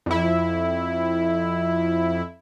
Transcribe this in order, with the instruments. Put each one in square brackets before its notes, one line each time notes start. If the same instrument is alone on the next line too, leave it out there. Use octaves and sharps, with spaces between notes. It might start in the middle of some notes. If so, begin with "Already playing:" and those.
[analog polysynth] F2 E4